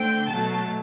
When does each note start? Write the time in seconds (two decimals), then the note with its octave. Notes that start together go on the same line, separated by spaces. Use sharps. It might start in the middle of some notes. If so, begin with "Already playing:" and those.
Already playing: D3 A3 C4 G5
0.29 B2 F#3 A3 A5